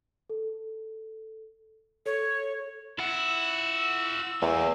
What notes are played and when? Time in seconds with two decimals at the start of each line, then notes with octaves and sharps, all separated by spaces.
0.30 A4
2.06 A4 C#5
2.99 E4 F4 F#5 E6
4.42 E2 A3 A#3